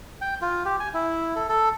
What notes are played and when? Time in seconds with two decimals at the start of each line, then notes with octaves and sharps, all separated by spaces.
0.21 G5
0.42 F4
0.65 G4
0.80 G#5
0.94 E4
1.36 A4
1.49 A4